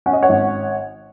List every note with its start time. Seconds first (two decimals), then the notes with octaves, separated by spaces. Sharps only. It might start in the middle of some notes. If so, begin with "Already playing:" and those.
0.06 C#4 F#5
0.13 D#5
0.22 C#5 F#5
0.29 G#1